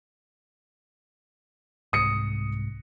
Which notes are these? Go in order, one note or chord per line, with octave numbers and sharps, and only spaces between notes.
C2 G#2 D#6 C#7